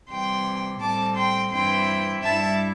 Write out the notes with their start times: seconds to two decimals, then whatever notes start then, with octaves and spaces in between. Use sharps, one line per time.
0.09 C3 E3 G3 G5 C6
0.80 A2 G3 C4 A5 D6
1.16 G5 C6
1.52 G2 E3 C4 E4 G5 C6
2.23 G2 G3 E4 E5 A5